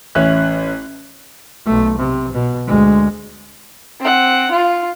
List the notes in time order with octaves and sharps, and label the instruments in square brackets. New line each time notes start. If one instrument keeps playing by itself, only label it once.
[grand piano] A1 C#4 E5 F#6
[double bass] B1 A3
C3
B2
D2 G#3
[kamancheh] C4 F#5
F4